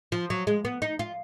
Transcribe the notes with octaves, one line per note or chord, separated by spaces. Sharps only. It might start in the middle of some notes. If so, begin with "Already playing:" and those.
F3
F#3
G#3
B3
D#4
F4